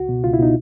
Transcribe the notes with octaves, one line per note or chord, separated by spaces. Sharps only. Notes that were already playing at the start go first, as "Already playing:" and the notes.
Already playing: C#2 F#4
B2
C#2 F4
E4
B2 D#4